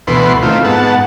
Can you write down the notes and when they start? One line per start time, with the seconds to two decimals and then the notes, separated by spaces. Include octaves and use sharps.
0.07 D2 B2 E3 B4 C6
0.43 D#3 A3 C4 F4
0.65 G#2 B3 F#5 A5